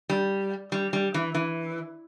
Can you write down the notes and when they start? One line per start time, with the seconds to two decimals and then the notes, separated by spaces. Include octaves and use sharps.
0.10 G3
0.72 G3
0.93 G3
1.14 E3
1.35 E3